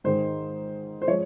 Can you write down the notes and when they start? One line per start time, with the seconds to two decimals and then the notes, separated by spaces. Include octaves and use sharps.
0.04 G#2 D#3 G#3 C5
1.02 C5
1.08 F3 G#3 C#5